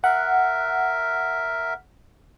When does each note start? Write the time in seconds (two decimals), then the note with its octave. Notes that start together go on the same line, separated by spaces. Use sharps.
0.04 A#4 E5 F#5